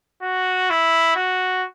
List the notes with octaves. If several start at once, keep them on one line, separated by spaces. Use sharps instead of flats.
F#4
E4
F#4